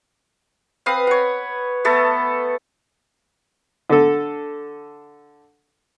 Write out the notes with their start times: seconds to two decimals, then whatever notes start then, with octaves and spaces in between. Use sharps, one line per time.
0.86 C4 B4 F5 D#6
1.07 C#5 F#5
1.85 A3 B3 A4
3.90 D3 A4